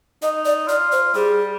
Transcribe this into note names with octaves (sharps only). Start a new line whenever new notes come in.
D#4 D#5
D5
F4 D5
C5
G3 G#4